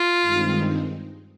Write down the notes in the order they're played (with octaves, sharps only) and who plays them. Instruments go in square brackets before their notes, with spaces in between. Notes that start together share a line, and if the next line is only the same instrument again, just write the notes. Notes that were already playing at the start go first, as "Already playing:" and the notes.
Already playing: [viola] F4
[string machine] G2 D#3 G#3 C4 D#4